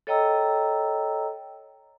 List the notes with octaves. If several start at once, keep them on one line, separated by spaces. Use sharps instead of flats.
A4 C#5 D#5 G5 A#5 E6